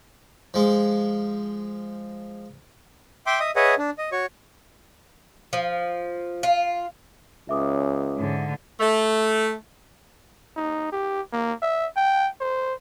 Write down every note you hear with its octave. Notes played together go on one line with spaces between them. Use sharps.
F3 G#3
E5 G5 C6 D6
D#5 E5 D#6
G#4 B4 C#5 D#5 E5 F#5
D4
D#5
F#4 C#5 C#6
F3
F4
C#2 C#4 E5 D6 D#6
G#2 D3
A3
D#4
G4
A#3
E5
G5
C5